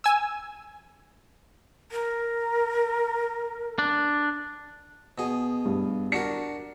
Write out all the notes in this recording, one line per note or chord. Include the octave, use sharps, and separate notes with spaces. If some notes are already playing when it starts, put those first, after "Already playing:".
G#5 E6
A#4
D4
B2 G#4
G2
D4 F#4 A#4 C#7